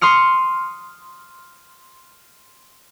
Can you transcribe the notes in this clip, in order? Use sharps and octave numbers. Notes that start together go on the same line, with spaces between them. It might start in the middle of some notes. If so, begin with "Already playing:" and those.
C6 D#6 F6 C#7